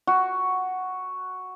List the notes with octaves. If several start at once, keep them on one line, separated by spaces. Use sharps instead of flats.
F#4